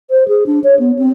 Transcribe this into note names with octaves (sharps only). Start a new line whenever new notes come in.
C5
G#4
D4
C#5
B3
C4